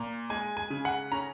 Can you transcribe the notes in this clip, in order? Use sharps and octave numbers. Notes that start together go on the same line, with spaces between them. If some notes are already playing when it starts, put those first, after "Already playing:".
Already playing: A#2 A#5
G#3 G#5
G#5
C#3
F#5
C#4 A#5